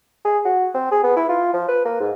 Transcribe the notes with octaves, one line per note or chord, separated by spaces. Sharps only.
G#4
F#4
C4
G#4
B3
E4
F4
F3
B4
A#3
G#2